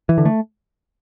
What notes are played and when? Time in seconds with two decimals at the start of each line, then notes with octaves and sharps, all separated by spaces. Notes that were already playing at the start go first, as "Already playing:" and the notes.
0.09 E3
0.18 D3
0.25 A3